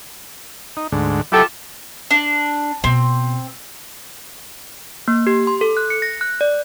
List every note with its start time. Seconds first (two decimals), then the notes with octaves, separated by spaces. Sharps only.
0.77 D#4
0.92 D2 G#2 D3
1.32 F#3 E4 F4 G4 A4
2.11 D4
2.84 B2 B3 C4
5.08 A#3
5.27 G4
5.47 C6
5.61 A4
5.77 F#6
5.90 C#7
6.02 A#6
6.21 F#6
6.41 D5